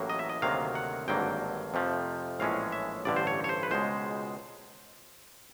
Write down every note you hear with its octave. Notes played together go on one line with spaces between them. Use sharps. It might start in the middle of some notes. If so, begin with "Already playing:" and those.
Already playing: A1 A2 F#3 A#3
D#5
E5
D#5
D2 C3 D#3 F#3 A#3 F5
F#5
G#1 G2 D3 F#3 A#3 G5
F2 C3 F3 A3
A#1 A2 E3 G#3 C#4 F5
E5
A1 G2 D3 D5
C5
C#5
C#5
C5
B4
C#2 B2 G#3 C5